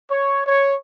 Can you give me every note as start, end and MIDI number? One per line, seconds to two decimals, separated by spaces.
0.11 0.45 73
0.46 0.75 73